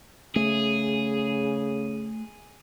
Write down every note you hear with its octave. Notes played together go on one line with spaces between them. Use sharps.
C#3 A3 G#4